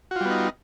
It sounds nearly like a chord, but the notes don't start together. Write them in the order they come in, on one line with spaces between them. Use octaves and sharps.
F#4 F4 G3 B3 D#4